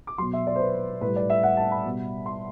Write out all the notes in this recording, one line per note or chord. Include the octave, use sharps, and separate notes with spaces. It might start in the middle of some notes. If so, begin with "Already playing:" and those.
D6
B2 F#3 C6
E5
D5
C5
B4
A2 B4
G3
D5
E5
F#5
A5
B5
B2 G3
C6